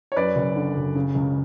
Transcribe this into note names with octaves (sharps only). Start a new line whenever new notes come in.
C#5
F#2 B4 D5
F#1
D3
F#1
C#3
C#2